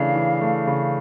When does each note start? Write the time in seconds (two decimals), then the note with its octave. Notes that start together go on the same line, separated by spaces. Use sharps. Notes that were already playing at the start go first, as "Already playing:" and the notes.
Already playing: C#3 E3 A3 D4 F5
0.15 E3
0.41 A3
0.67 C#3